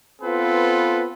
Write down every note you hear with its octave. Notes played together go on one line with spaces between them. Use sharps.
B3 C4 F4 A4 B4